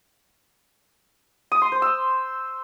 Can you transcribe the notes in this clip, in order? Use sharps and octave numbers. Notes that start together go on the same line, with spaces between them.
D#6
C6
C5
E6